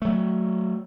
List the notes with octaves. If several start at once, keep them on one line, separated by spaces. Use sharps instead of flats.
F#3 A3